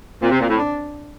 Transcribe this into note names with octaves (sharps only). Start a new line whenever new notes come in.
A#2 C4
C3
A#2
A2
D4